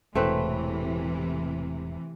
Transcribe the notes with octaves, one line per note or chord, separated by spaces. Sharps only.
E1 A2 C3 E3 A3 C4 B4